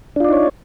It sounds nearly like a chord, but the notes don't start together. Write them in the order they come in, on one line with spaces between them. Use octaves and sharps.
D4 F4 D5 D#4 C#5